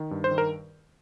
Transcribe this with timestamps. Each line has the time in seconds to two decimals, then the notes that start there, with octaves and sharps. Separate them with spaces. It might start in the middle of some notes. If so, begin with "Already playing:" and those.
Already playing: D#3
0.11 G2
0.24 C5
0.31 D#3
0.38 A#4